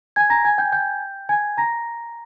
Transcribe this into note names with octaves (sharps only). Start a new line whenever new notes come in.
G#5 G#6
A#5 A#6
G#5 G#6
G5 G6
G5 G6
G#5 G#6
A#5 A#6